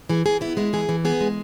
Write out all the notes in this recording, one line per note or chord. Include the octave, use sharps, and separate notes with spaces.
E3 G#4
E3 G#4
B3 E4
G#3 E4
E3 G#4
E3
B3 G#4
G#3